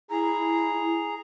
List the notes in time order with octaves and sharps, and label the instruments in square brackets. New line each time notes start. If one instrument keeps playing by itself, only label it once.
[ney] E4 [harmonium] G#4 A#5